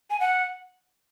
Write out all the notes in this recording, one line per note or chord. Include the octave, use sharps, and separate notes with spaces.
G#5
F#5